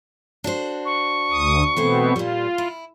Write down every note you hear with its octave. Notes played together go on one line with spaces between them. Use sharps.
D4 F#4 C5
C#6
D2 D#6
B2 E3 A3 B3 C4 C5
A#2 G3 F4
E4